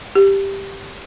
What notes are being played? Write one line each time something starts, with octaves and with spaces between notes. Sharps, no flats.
G4